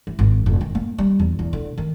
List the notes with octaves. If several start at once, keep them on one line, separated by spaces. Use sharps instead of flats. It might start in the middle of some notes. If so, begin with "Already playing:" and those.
E3
G#1
F1
D#3
A#3
G3
E2
E2
D3
D#3